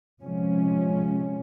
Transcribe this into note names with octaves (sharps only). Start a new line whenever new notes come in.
C3 F3 G#3 C#4